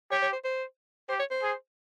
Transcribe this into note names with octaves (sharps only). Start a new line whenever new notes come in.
G4 C#5
C#5
C5
C5
G4 C5
C#5
C5
G#4